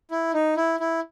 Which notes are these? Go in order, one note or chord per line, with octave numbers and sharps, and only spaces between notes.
E4
D#4
E4
E4